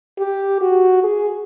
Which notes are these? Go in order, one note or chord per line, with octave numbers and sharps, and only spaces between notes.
G4
F#4
G#4